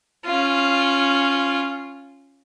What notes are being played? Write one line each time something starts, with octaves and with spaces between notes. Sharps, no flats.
C#4 F4